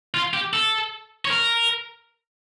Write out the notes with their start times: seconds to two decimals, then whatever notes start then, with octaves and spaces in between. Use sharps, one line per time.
0.14 F4
0.34 G4
0.53 A4
1.25 C#5
1.31 A#4